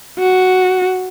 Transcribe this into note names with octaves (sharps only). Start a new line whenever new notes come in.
F#4